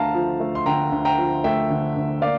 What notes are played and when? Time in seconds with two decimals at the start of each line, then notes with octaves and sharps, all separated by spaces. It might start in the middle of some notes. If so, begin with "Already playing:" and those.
Already playing: D2 D3 A3 F5 A5 A#5
0.15 F3
0.40 A3
0.55 C6
0.66 D3 G5 A#5
0.92 D2
1.05 G5 A#5
1.18 F3
1.44 A3 E5 G5
1.70 D3
1.97 D2
2.22 A#3 D5 F5